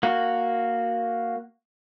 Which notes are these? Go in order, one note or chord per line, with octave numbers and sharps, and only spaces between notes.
A#3 F#4